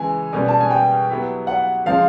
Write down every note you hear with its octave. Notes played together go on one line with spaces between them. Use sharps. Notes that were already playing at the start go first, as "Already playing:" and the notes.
Already playing: C#3 E3 G#3 G#5
B2 G3 A#3 C#4
A5
G#5
G5
F#3 B3 E4 G4
F#5
C#3 F3 G#3 F5